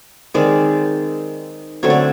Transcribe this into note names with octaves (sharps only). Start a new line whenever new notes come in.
D#3 G#3 C4 D5
D3 F#3 A3 C4 C#5
D5